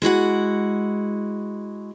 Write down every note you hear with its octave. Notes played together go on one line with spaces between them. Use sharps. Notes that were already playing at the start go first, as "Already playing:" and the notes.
G#3 E4 F#4 F#5